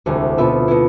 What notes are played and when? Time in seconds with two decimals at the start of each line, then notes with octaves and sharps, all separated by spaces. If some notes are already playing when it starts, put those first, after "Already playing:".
0.06 E1 D2 C3 E3
0.38 B2 B3 F4 B4 E5
0.68 B2 B3 E4